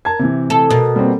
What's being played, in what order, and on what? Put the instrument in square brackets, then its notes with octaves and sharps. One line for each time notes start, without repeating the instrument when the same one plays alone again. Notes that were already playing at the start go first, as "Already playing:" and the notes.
[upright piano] A#4 A5 G#6
C3 E3
[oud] A4
[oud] B2 [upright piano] A#4
[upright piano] G3 A#3 C4